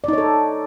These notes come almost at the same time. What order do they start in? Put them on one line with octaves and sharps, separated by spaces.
D5 D#4 C#5 A4